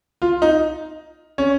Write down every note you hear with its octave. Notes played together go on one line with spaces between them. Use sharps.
F4
D#4
C#4